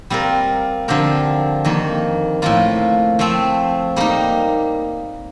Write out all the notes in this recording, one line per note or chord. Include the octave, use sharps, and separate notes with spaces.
G3 C4 F4 A#4
D3 F3 C4 G4 A#4
F2 D#3 A#3
A2 F3 A#3 F4
F3 A3 C4
G3 A#3 D#4